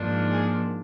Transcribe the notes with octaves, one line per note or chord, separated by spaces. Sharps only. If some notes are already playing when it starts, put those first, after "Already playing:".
Already playing: G#2 F3 A#3 D4
G#4